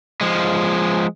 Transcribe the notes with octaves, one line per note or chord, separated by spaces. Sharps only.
F3 G#3